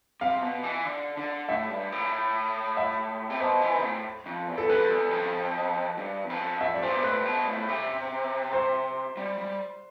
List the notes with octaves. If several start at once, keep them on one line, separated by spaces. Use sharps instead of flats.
C3 F5
B2
E3
D3
D3
A2 E5
G2
A2
E5
C3
B2 C5
E3
A2
F2
E2
A4
F2 B4
E2
F2
G2
E2
F2
F2 E5
D5
G2 C5
B2
A2 B4
B2
A2
C3
C5
G3
G3